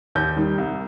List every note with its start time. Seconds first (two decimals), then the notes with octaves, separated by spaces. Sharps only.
0.15 D#2 G6
0.36 D#3 G3
0.58 C2